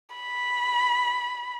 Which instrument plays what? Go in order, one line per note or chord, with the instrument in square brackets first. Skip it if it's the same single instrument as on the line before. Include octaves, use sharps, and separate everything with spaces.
[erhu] B5